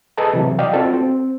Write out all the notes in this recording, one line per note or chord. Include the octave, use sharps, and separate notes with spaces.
G#4 A4 B4 D#5 A5
C3 E3 F#3
D5 D#5 F5 G5
C4 F4 F#4 A4
C4